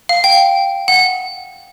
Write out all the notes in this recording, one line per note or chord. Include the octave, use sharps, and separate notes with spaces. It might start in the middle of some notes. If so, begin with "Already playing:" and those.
F5
G5
F#5